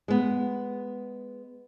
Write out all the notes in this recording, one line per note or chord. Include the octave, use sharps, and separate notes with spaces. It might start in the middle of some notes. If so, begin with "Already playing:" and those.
G#3 B3